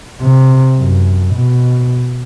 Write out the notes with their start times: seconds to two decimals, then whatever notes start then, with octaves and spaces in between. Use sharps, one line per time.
0.21 C3
0.78 F#2
1.35 B2